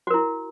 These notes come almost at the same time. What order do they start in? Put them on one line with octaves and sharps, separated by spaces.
F#4 A#4 E4